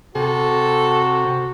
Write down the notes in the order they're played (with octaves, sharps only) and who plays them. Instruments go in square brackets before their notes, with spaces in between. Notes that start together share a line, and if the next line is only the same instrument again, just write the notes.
[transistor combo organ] C3 [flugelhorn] F#4 [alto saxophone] A4